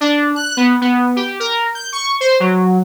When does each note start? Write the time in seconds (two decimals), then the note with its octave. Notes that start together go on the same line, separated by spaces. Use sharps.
0.01 D4
0.36 F#6
0.57 B3
0.81 B3
1.16 G4
1.40 A#4
1.75 G6
1.93 C#6
2.21 C5
2.40 F#3